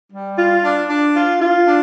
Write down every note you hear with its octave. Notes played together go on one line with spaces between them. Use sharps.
G3
F4
D4
D4
F4
F4
D4